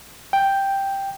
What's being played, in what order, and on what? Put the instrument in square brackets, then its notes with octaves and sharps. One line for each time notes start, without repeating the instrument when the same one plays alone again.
[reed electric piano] G5